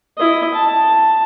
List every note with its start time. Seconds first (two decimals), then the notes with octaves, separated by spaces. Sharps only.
0.17 E4 D#5
0.54 A5